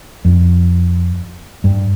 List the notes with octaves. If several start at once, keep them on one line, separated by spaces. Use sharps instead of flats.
F2
G2